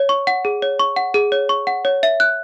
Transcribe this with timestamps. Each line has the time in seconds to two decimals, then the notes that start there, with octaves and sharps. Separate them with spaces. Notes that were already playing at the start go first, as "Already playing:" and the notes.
Already playing: C#5
0.09 C#6
0.27 F#5
0.45 G#4
0.62 C#5
0.79 C#6
0.96 F#5
1.14 G#4
1.32 C#5
1.49 C#6
1.67 F#5
1.85 C#5
2.03 E5
2.20 F#6